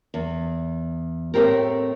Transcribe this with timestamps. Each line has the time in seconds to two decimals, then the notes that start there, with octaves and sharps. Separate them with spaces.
0.14 E2
1.34 A2 A3 C4 G4 A#4